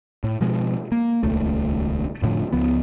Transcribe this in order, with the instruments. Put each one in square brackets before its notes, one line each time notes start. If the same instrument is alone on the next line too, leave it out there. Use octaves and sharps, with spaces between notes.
[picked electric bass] A2
B2 F3 G#3
A#3
D#1 C#2 A3
F1 A2 D3 F3
C#2 F3 B3